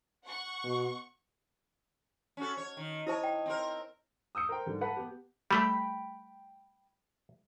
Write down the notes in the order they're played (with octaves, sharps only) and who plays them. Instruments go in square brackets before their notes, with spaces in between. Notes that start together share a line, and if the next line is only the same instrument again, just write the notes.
[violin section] F#5 C#6
[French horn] B2
[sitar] C#4 F#4 A4
C#5
D#3
[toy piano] E4 C5 A5 [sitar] C#5 D#5
[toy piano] G5
[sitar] C4 A#4
[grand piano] D#6 E6 G6 C#7
A#4 C5 G5
G#2 D3 G3
B4 F#5 A5 B5
B3 G4
[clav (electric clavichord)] G3 A3 [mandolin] G5 B5